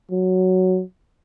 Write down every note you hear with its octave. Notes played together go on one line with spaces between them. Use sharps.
F#3